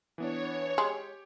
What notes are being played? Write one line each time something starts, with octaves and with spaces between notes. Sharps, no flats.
E3 B3 D4 C#5
G#3 G4